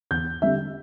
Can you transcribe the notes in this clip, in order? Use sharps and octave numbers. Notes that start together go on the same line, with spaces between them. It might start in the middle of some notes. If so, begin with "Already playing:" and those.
E2 G6
D3 G3 C4 E5